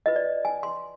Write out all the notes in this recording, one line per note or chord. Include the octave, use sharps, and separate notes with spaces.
F4 B4 D#5
D5
G#5
C6